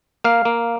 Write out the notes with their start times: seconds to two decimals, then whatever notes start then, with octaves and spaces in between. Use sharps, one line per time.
0.24 A#3 F5
0.45 A#3